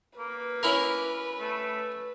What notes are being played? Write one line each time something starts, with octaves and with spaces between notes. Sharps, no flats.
A#3 B4
C#4 E4 A#4
A3